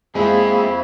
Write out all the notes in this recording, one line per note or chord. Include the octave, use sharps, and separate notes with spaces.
G#3 A#3 C4 E4 F4 G#4